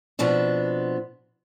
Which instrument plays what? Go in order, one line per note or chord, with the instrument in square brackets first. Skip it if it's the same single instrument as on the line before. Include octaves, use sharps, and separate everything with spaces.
[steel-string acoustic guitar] B2 F3 B3 C4 D4